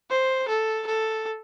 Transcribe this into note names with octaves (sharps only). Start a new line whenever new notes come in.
C5
A4
A4